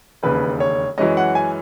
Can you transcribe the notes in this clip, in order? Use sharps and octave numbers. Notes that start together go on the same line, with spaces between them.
E1 D#2 C#3 B4
C#5
F#2 E3 G#3 C#4 D#5
F#5
G#5